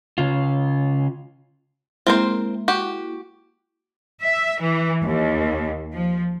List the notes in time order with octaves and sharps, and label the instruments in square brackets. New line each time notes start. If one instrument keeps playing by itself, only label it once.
[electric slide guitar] C#3 F4
[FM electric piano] G#3 A#3 E4 [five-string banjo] C4 A#4 C5
[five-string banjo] F#4 G4
[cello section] E5
E3
D#2
F3